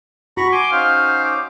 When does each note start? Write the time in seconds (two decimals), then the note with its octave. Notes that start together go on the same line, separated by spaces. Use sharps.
0.37 F#4 A#5 B5 C#6
0.52 G#5 C6 D6
0.72 C#4 D#4 C5 F5
1.24 D6